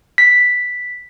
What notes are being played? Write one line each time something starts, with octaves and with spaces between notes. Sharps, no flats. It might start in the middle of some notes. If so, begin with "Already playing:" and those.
B6